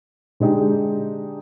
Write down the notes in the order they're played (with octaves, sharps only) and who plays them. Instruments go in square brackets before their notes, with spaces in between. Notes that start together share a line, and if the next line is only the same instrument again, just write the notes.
[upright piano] D3 G#3 D#4 G4